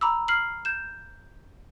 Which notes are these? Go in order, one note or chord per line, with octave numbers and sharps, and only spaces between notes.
A#5 B5 D6 E6
F6 C7 F#7
G6 E7